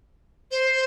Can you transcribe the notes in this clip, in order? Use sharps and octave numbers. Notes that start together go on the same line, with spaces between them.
C5